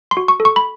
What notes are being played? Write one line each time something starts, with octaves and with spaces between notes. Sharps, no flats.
C6
F#4
C#6
A4
C#6
B5